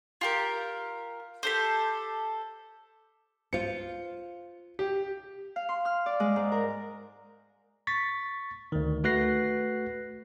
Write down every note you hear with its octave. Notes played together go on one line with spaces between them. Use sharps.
F4 G4 A#4
G4 A4 C5
F4 C5 C#7
G4
F5
C6
F6
D5
G#3
G#2
A#4
C#6 A6 B6
D2 D#3
A3 F#4 B4 F#6 A#6 C7